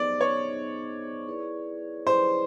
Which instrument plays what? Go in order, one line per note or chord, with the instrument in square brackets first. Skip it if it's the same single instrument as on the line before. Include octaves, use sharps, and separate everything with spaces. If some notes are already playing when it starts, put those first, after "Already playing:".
Already playing: [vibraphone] B3 D#4 G#4 C5 D#5 [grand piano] D5
[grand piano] C#5
[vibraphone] B3 D#4 G#4 C5 D#5
E4 G#4 B4 D5
[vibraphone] E4 G#4 B4 D5 [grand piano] C5